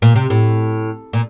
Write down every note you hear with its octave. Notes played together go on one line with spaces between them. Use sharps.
A#2
C3
A2
A#2